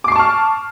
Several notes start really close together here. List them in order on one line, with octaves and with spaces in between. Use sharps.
D6 C7 C#6 A5 F6